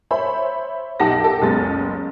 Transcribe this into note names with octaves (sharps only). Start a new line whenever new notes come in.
C5 C#5 E5 B5
B1 D#4 G4 F#5 A5 A#6
G4 A4
F#1 C#2 G#3 B3 A6